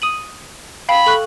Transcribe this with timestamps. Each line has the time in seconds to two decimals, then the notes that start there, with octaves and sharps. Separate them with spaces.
0.02 D#6 D#7 F#7
0.89 F5 G5 B5 F#7
1.06 A4 C#6 F#6